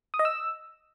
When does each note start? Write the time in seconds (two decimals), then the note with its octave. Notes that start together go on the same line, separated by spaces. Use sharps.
0.14 D#6
0.19 D#5
0.25 E6